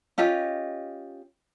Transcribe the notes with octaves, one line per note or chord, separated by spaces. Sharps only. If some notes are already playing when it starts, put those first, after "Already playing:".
C#4 F4 G4 D#5